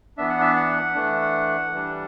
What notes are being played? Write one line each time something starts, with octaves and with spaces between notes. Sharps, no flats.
E3 B3 D4 E5
F#5
E5
F#5
E3 A3 D4
E3 G3 D4